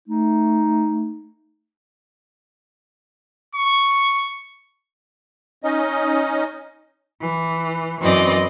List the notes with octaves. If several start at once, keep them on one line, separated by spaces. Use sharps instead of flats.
A3 D#4
C#6
C#4 D#4 D#5
E3
F#2 E3 C4 D5 D#5